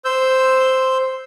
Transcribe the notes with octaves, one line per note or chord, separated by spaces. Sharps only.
C5 E6 G6